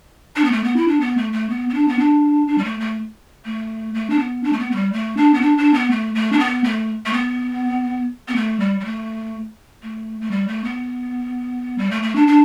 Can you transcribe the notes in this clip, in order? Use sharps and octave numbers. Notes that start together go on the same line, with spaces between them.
D4
B3
A3
B3
E4
D4
B3
A3
A3
B3
B3
D4
B3
D4
D4
G3
A3
A3
A3
A3
D4
B3
D4
A3
B3
A3
G3
A3
D4
B3
D4
D4
B3
A3
A3
D4
B3
A3
A3
B3
B3
A3
G3
G3
A3
A3
A3
G3
A3
B3
G3
A3
A3
D4
D4